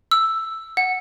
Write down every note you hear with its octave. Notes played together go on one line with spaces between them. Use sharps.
E6
F#5